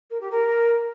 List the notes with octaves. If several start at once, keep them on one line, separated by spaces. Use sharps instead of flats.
A#4
G4
A#4